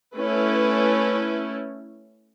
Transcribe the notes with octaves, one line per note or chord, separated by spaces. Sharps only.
A3 C#4 E4 B4